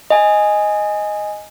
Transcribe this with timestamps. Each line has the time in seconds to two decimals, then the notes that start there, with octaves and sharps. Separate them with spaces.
0.10 D#5 G#5